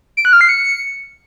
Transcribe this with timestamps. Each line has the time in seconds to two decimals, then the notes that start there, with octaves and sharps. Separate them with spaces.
0.17 D7
0.25 F#6
0.33 F6
0.41 C7
0.49 C#7